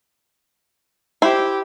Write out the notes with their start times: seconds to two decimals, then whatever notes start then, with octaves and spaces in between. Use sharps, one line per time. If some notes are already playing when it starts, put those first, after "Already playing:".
1.22 E4 G4 C5